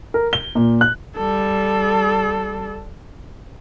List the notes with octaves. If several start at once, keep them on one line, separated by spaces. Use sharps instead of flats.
A#4
G7
A#2
F#6
G3 A4